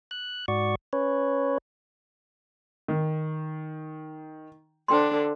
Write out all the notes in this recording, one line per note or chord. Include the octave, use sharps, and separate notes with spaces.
F#6
G#2 F#4 D5 C#6
C#4 B4 C#5
D#3
D3 D4 C5 G5 C6